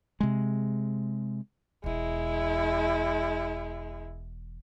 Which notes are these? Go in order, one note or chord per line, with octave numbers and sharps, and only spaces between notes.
C3 G#3
E1 E2 G#3 E4